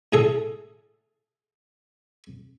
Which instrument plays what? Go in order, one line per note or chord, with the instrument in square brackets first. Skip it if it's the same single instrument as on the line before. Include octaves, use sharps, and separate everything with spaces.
[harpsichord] A2 G#4 A4